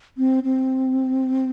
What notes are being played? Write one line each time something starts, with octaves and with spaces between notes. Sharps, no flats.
C4
C4